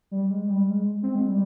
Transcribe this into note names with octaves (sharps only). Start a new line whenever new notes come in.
G3
G#3
G3
G#3
C4
G#3
G3